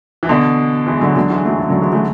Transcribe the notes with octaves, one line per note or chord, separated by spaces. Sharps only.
E3
B2 D3
E3 G#3
D3 F#3
D3 F#3
E3 G#3
F#3 A3
C#3 E3
D3 F#3
E3 G#3
F#3 A3